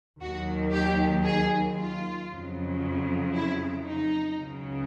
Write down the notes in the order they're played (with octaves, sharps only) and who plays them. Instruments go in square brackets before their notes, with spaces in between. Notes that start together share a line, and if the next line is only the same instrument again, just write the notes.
[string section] D#2 D#3 F#3 F#4
G4
G#4
F4
F2 C#3 F#3
E4
D#4
C#2 C#3 F#3